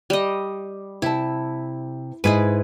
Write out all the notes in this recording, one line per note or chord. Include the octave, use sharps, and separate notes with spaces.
G3 D#5
C3 E4 A5
G#2 E4 G#4 B4